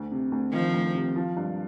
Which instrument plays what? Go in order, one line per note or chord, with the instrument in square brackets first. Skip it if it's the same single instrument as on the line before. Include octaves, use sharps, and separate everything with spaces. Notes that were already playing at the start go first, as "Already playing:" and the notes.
Already playing: [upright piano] D2
C3
D2
[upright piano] D#3 [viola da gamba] F3
[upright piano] D2
C3
F3
G2